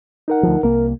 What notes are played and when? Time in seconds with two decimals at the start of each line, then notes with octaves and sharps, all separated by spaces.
0.28 D#4 A#4 F#5
0.43 D2 F3
0.63 C2 A#3 A#4